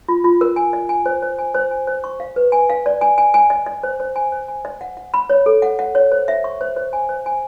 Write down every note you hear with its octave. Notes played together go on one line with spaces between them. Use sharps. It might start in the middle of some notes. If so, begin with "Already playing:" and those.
F4
F4
A#4
G#5
D#5
G#5
C5
C5
G#5
C5
G#5
C5
C#6
F5
B4
G#5
F5
D5
G#5
G#5
G#5
D#5
D#5
C5
C5
G#5
C5
G#5
D#5
F#5
F#5
B5
C#5
A4
F#5
F#5
C#5
C5
E5
C#6
C5
C5
G#5
C5
G#5